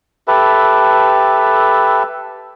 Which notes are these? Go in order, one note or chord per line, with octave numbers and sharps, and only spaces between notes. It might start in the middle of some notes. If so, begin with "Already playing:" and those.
G4 A4 B4 E5